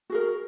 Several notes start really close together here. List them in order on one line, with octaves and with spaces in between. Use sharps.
F#4 G#4 A#4